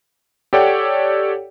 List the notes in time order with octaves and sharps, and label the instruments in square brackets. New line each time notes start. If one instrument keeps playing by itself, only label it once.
[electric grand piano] G4 A4 C#5 D5 F#5 G5